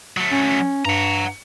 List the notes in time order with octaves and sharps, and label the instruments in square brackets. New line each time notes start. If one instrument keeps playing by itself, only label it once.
[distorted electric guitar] F#3 A3
[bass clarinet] C#4
[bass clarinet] G2 [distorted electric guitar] F#5 A#5